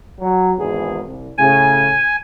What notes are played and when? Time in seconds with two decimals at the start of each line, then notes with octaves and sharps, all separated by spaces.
0.20 F#3
0.58 G#1 E2 G#4
1.06 C2
1.38 A2 C#3 G#5